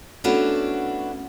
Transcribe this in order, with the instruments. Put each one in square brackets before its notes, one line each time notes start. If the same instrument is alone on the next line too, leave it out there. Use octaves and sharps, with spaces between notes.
[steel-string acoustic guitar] A3 B3 C#4 D4 E4 F#4